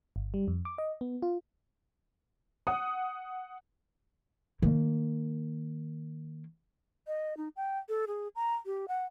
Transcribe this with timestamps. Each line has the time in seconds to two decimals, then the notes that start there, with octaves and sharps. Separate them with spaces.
0.16 G1
0.34 G3
0.48 F2
0.65 D6
0.78 D#5
1.01 B3
1.22 F4
2.67 F#5 D#6
4.62 D#3 A#3
7.06 D#5
7.37 D#4
7.56 G5
7.89 A4
8.07 G#4
8.36 A#5
8.66 G4
8.88 F#5